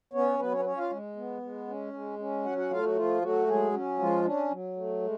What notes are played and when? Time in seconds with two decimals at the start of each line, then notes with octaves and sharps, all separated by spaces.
0.13 B3 C#4 C#5
0.39 F#3 B3 B4
0.52 C#4 C#5
0.59 B4
0.65 C#4 C#5
0.78 F4 F5
0.91 G#3
1.16 B3
1.42 G#3
1.68 C#4
1.93 G#3
2.19 C#4
2.45 F#3 F#4 F#5
2.57 F#4 F#5
2.71 A3 F4 F5
2.83 F#3 F#4
2.96 F3 F4
3.22 F#3 A3 F#4
3.48 F#3 G#3 G#4
3.73 C#4
3.99 F3 G#3 F4
4.25 C#4 D4
4.50 F#3
4.76 A3
5.02 G#3